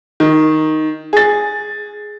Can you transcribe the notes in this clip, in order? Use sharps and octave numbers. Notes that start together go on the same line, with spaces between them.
D#3
G#4 A6